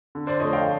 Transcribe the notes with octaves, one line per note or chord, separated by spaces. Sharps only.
D3
C5 D5
F3 A3 C#5 D#5
F5 G5